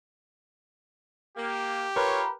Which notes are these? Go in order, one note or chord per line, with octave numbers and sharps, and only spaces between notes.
A#3 G4
F4 A#4 B4 C#5